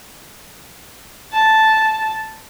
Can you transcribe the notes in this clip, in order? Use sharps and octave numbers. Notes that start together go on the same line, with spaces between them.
A5